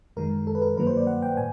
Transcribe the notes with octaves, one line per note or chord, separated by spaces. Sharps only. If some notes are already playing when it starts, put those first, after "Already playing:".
F#2 D#3 G#3 A#4
A4
B4
A#4
G2 D#3 F#3 A#3 B4
C5
D5
F#5
G5
A2 G#5